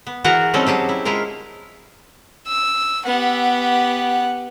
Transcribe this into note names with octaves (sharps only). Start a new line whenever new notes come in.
B3
E3 F#4 G#4 A#4 F#5 A#5
G3 C4 C#4 D#4 A4
F#3 G4 G#4 A5
E4
G#3 E4 F4 A#4
E6
B3 G4 F#5